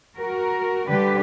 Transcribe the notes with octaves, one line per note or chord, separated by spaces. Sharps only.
F#4 A#4
D3 G3 G4 B4